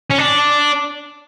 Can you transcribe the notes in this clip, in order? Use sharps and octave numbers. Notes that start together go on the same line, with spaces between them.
C#4
D4